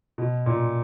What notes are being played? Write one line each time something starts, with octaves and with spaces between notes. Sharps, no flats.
B2
A#2